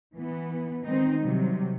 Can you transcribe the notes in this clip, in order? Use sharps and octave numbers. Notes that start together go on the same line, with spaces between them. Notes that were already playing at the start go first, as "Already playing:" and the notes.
E3 B3
D#3 G#3 C4 D#4
C3 F#3 G3